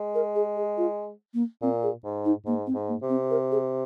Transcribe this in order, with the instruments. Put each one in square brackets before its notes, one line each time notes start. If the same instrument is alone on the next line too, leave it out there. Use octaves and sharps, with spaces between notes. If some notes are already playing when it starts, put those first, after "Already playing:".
Already playing: [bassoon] G#3
[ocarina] A#4
G#4
G#4
F4
A#3
[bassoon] A#2 [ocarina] C4
[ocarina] G#4
[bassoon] G#2
[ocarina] D#4
[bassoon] G#2 [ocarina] A#3
[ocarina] C4
[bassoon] G#2
[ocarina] A#3
[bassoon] C3
[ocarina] C4
A#4
G#4